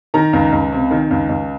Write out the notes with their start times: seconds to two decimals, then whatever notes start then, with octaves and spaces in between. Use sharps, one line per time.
0.14 D#3 A#5
0.33 C#2
0.52 C#2
0.72 C3
0.91 D#3
1.11 C#2
1.29 C#2